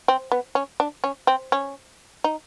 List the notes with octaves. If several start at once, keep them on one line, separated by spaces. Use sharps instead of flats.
C4
B3
C#4
D4
C#4
C4
C#4
D#4